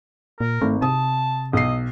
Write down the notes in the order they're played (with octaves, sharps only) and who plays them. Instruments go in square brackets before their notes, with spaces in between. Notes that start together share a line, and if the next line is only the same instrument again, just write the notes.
[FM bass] A#2 [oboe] A#4
[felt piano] G#1 [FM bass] A3
[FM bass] C3 [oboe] A5 [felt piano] D#6
[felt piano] B1 C7 [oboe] D#5